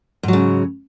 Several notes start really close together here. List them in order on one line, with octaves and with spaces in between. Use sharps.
G#2 F#3 C#3